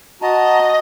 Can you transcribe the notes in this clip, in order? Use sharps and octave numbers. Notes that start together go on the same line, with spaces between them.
F#4 D#5 A5 A#5